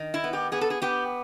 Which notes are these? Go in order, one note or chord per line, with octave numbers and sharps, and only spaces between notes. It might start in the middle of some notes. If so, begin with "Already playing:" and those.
Already playing: D#3
E4
B3
G4
B3 G#4
A4
G#4
B3 G4